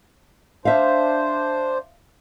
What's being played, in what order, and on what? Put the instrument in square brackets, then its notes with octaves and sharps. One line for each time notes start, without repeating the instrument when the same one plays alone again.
[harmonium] D4 C5 [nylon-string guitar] E5 F5